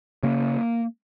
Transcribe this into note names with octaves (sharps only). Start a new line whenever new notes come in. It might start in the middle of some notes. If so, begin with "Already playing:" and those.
C#3 A#3